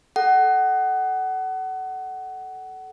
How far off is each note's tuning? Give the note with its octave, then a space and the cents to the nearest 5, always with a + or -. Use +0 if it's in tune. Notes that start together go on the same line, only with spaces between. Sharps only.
A4 -15 F#5 +25